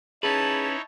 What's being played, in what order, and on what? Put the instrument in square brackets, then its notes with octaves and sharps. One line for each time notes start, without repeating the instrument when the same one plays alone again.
[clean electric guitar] C#4 B4 [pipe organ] D#4 E4 C#5 [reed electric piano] G#4 [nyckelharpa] A5